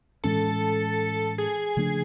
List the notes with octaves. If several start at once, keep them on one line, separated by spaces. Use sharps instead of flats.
A2 E3 G#3 C#4 A4
G#4
C#3 F3 A3 D4